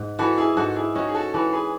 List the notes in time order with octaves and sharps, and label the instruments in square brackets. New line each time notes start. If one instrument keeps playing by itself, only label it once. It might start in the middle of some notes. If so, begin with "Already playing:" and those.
Already playing: [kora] G#2
[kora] E3 [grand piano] F#4 A4
[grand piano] E4 G#4
[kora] G#2 [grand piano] F#4 A4
[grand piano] E4 G#4
[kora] C#4 [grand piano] D#4 F#4
[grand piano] G#4
F#4 A4
[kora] E3 [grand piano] F#4 A4
[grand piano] G#4 B4